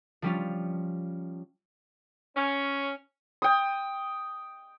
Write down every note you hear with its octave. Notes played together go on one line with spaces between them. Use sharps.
F3 G3 C#4 F4
C#4
G5 D#6